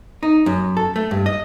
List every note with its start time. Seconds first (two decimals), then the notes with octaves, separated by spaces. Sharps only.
0.23 D#4
0.46 F#2
0.77 A4
0.96 A3
1.11 G2
1.26 D#5